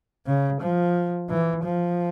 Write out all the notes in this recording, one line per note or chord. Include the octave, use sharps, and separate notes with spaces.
C#3
F3
E3
F3